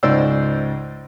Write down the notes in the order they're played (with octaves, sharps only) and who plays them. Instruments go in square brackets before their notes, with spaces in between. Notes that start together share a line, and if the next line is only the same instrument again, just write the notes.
[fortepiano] C#2 G#2 C#3 C5 D5 E6